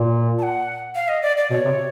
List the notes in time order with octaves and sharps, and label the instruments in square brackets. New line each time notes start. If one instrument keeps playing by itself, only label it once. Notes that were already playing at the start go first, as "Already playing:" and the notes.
Already playing: [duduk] A#2
[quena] A5
F#5
F5
D#5
D5
D5
[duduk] B2 [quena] C#5
[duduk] C3